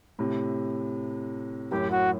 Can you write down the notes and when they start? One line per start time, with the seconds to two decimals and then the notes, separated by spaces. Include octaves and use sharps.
0.19 A2 C3
1.71 F#2 A2 G4
1.91 F#4